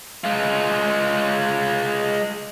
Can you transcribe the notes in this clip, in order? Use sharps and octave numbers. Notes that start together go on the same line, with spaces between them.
G#3 F4